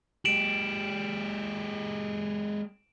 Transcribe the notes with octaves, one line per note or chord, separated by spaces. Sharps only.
G#3 G4 D7 E7 F#7